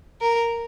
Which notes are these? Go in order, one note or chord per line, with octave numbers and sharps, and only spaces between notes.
A#4